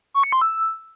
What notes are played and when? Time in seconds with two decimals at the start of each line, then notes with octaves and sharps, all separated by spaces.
0.14 C#6
0.23 C#7
0.32 C6
0.41 E6